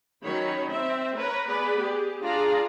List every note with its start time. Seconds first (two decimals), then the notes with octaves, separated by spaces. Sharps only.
0.24 D#3 F#3 C#4 D#4 C#5 B5
0.69 C4 E5
1.16 A#4 B4 C#5 A#5
1.47 B3 G#4 B4 D5 B5
1.80 G4 G#4
2.21 D4 F4 G#4 D5 F5 A#5